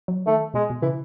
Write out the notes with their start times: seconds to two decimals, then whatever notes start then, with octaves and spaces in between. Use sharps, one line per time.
0.08 F#3
0.27 D#3 A3
0.54 B2 G#3
0.70 B2
0.82 C#3 E3